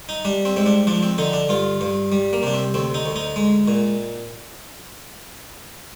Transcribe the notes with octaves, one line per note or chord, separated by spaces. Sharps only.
D#4
G3 D4
C4
G#2 C4
D4
F3 D4
C4
D3 D#4
D4
G2 F4
G2
G3
A#3
C3 D4
C4
D2 C4
D#4
D2
D#4
G#3
A#2